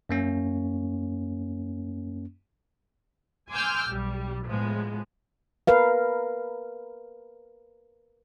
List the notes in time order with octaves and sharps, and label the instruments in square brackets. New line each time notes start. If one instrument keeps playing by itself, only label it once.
[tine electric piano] F#2 A#3 C#4
[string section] G#5 C6 D6 E6 F6 G6
B1 G3
A2 F3 G#3 B3
[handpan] A#4 B4 F5